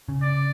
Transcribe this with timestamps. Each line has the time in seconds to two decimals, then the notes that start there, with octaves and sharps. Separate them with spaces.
0.08 C#3
0.22 D5